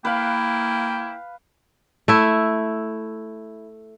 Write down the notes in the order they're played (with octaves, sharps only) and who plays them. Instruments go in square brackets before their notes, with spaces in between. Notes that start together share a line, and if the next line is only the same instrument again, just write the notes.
[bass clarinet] A#3 [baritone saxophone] E4 [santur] B4 F5 [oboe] G5
[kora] A3 E4